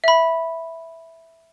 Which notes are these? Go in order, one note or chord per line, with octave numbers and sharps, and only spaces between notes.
E5 B5